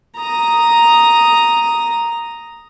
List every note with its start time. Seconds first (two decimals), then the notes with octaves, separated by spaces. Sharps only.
0.18 A#5 D#6